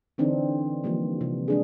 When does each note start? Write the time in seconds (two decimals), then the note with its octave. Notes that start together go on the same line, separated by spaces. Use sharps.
0.18 D3 E3 C4 D4 D#4
0.84 E3 F3 G3 A#3
1.21 C3
1.48 G#3 D4 G#4